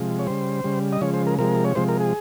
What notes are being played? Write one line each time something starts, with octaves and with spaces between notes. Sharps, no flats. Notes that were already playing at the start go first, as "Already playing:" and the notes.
Already playing: C3 F3 G#3
C#5
C#3 G3 C5
C#3 G3
D#5
C#3 F3 G#3 C#5
C5
A#4
C3 F3 G#3 A#4
C#5
C3 F3 G#3 C5
A#4
G#4